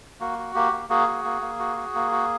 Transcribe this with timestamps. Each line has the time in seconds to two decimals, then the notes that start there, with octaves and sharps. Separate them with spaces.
0.20 A#3 F#4
0.38 F#4
0.55 A#3 G4
0.72 A#3
0.89 A#3 F#4 G#4
1.07 F#4
1.25 A#3
1.42 A#3
1.59 F#4
1.77 F#4
1.95 A#3
2.12 F#4